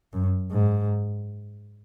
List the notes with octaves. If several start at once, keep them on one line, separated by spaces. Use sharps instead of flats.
F#2
G#2